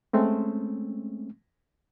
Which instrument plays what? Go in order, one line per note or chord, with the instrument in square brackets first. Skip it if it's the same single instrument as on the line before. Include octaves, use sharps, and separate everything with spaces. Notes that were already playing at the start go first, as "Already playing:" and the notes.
[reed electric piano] G#3 A3 C4 C#4